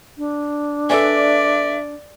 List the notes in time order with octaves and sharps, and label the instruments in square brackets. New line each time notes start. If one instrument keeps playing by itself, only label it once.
[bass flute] D4
[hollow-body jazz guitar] A4 B4 G#5 [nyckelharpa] D5 [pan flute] E5